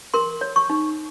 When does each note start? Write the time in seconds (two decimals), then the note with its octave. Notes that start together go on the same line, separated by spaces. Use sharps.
0.14 A#4 C6
0.41 C#5
0.56 C#6
0.70 D#4